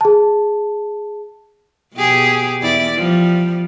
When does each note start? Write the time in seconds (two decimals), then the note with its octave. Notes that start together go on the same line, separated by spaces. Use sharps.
0.01 G#4 A5
1.95 B2 G4 G#4
2.61 E2 E4 D5
2.96 F3 G3